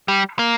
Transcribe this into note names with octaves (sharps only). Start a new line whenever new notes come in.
G3
A#3